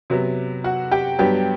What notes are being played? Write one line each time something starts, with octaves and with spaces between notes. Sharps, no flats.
C3 F#3 B3
F#4 F#5
G4 G5
G2 F#3 B3 G4 G5